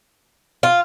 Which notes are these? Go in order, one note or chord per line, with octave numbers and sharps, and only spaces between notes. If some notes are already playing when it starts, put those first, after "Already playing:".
F4